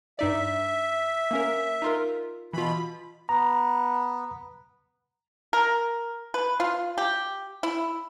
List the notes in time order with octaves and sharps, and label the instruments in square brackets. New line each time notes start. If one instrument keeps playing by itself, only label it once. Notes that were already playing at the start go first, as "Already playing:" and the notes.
[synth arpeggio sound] G2 D#4 D5 [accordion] E5
[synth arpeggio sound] A#3 C#4 A#4
D#4 F4 A#4
[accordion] B2 B5 [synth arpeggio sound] E3 F4
[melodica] B3 [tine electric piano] A#5
[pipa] A#4
B4
F4
G4
E4